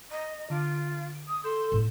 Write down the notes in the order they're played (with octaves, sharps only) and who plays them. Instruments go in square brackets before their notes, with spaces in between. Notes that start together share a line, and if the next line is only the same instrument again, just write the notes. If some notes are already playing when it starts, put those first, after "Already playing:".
[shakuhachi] D#5 [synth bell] A#5
[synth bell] D3 D7 [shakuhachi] F4
[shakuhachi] D#6
[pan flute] A4 [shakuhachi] C6 [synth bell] G6 E7
[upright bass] A2 B3